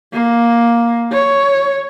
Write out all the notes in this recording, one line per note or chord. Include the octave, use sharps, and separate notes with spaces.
A#3
C#5